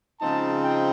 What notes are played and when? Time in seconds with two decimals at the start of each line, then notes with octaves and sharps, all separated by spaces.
0.20 C#3 F3 G#3 C4 D#4 A5
0.63 G5